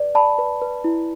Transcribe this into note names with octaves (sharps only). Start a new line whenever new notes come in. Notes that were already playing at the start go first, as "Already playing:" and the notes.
Already playing: B4 D5
D5 A5 B5
B4
B4
E4